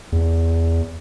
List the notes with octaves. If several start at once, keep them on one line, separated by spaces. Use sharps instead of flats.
E2